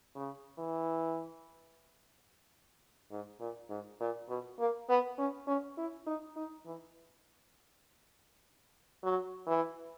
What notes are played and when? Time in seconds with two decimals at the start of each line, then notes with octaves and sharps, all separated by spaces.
0.15 C#3
0.58 E3
3.11 G#2
3.40 A#2
3.69 G#2
4.00 A#2
4.29 B2
4.59 A#3
4.89 B3
5.18 C#4
5.47 C#4
5.77 E4
6.07 D#4
6.36 D#4
6.66 E3
9.03 F#3
9.47 E3